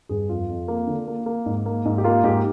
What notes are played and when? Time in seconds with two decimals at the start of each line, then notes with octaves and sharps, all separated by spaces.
0.09 G2 G#4
0.29 F2 F4
0.49 F2
0.68 A#3
0.87 D3
1.08 A#3
1.26 A#3
1.46 G#2
1.66 A#3
1.85 G#2
1.98 G4
2.04 A#3 F4
2.24 G#2 G4